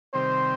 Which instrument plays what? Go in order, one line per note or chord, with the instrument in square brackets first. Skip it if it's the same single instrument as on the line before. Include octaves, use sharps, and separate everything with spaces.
[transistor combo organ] C3 D#3 G3 C4 [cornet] C5